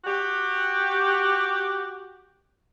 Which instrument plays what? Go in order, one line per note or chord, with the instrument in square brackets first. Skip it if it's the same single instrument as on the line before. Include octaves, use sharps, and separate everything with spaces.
[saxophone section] F#4 G4